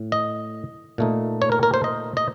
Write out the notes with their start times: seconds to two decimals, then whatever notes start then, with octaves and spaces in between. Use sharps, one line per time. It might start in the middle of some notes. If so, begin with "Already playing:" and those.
Already playing: A2
0.12 D#5
0.98 A#2 A3 D#4
1.42 C#5
1.52 A#4
1.63 A#4
1.74 C5
1.84 D#5
2.17 D#5